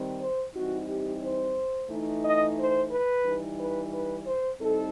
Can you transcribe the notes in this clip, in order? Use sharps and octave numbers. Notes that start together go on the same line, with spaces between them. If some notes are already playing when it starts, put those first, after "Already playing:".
Already playing: D#3 G3 C4
C5
E3 G3 C4 D#4 F#4
G4
C5
E3 A3 D#4
D#5
C5
B4
E3 G3 D#4
B4
B4
C5
A2 G3 C4 D#4 A4